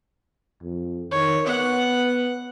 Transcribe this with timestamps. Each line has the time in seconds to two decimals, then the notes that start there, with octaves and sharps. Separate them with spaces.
0.62 F2
1.12 D#3 C#5
1.47 B3 F#5